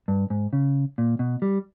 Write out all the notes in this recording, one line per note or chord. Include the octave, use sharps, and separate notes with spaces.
G2
G#2
C#3
A#2
B2
G3